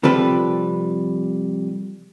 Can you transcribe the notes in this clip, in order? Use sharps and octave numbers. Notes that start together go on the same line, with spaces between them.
C3 F3 G3 A4 B4